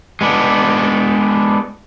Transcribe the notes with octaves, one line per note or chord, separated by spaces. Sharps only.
G#3 B3 D4